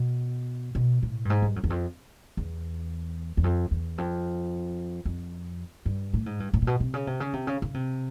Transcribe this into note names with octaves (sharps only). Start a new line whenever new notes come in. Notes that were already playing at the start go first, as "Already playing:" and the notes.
Already playing: B2
B2
A2
G2
G#2
G2
F#2
E2
F2
E2
E2
F2
E2
F2
F2
G2
A2
G#2
G2
A2
A#2
B2
C3
C#3
C3
C#3
C3
C#3
C#3
C3